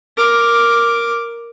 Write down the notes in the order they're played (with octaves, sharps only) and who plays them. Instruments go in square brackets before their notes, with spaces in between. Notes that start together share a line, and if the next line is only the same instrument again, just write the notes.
[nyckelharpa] A#4 D6